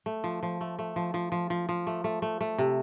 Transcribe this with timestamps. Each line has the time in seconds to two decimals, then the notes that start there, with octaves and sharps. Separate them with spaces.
0.06 A3
0.24 F3
0.43 F3
0.61 A3
0.79 A3
0.96 F3
1.14 F3
1.32 F3
1.50 F3
1.69 F3
1.87 A3
2.04 A3
2.22 A3
2.41 A3
2.58 C3